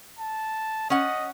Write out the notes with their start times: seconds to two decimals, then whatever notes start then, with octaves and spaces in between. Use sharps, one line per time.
0.19 A5
0.90 C#4 D#5 F#5